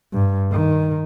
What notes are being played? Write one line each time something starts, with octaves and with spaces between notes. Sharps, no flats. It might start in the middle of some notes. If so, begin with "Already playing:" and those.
G2
D#3